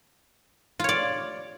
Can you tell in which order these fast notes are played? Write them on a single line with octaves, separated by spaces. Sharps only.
F4 C#5 D5